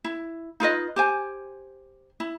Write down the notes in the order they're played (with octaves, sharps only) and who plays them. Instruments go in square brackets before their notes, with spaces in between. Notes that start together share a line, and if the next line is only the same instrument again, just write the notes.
[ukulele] E4
D#4 F4 B4 D#5
G4 C5 G#5
E4